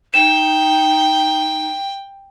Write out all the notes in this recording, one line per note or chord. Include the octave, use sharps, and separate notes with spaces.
D#4 G5 E7